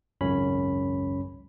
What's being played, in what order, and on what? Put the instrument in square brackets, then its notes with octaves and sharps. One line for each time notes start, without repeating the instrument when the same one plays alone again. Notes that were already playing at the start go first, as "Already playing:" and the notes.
[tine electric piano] G#1 C#2 F#2 C#4 C#5 B5